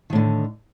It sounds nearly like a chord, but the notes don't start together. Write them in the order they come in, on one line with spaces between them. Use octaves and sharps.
D#3 A2 D3